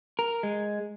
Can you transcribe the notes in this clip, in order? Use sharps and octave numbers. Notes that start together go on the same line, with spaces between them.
A#4
G#3